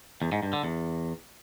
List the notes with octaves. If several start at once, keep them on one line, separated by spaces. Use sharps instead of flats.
E2
G#2
G2
D3
E2